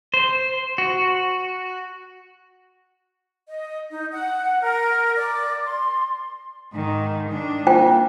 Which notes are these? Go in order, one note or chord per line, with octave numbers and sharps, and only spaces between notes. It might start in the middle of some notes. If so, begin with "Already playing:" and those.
C5
F#4
D#5
D#4
F#5
A#4
D5
C6
G#2 D#3
D#3 D4
A#3 F4 C5 G5